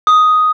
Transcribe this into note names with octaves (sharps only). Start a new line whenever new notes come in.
D#6